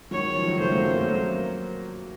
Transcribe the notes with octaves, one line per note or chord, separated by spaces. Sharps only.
D#3 F#3 C#5
C#3 F3
D#3 F#3
F3 A3 C5
F#3 A#3
A#3 C#4
A3 C4
F#3 A#3